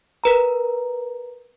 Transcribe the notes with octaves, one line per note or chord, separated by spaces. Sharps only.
A#4 B4 A#5